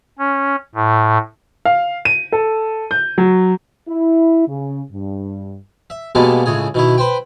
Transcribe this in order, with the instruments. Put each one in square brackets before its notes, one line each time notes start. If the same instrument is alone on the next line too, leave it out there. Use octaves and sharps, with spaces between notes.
[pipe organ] C#4
A2
[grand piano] F5
D#7
A4
G6
F#3
[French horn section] E4
C#3
G2
[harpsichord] E5
B2 G3 G#3 A#3 B3 A4
C#2 A2 G#4
B2 D#3 E4
B4 C5 G5